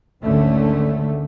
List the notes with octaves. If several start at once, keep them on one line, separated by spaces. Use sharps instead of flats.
G#1 D2 D3 A3 C#4